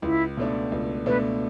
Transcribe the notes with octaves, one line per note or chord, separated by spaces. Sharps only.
C#2 E4
B2 A3 D4
C#2
B2 A3 D4 B4